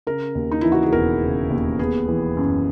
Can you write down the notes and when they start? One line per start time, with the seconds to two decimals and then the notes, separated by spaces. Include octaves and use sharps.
0.07 C#3 A#4
0.35 D#2
0.51 D#4
0.61 E3 E4
0.72 F#4
0.83 G#4
0.93 E1 A#4
1.22 C#3
1.50 D#2
1.79 B3 G#4
2.08 E3
2.37 F#2